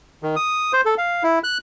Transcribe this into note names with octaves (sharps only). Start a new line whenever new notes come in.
D#3
D#6
C5
A4
F5
E4
F#6